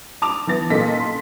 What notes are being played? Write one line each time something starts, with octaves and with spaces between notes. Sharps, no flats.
A5 D6 F7
E3 B3 A6
A#2 C#4 A4 D#5 B6
C6